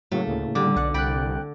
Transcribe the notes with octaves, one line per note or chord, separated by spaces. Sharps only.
A2 C#3 F#3 A3 A#3
D2
D3 G3 D6
B1 D5 F#5
C2 D5 G5 B5 F#6